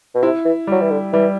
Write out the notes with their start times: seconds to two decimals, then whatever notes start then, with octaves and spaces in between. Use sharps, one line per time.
0.15 B2
0.22 C3 E4
0.45 E3
0.67 F#3 G3
0.81 E3
0.91 D3
1.13 E3 G3